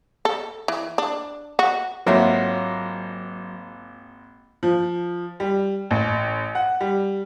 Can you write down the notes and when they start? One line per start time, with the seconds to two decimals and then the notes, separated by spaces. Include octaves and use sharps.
0.25 A4
0.68 E3
0.98 D4
1.59 F#4
2.06 G#1 F#3 A#3 F4 A4 C#5 E5 F#5
4.63 F3
5.40 G3
5.91 A1
6.55 F#5
6.81 G3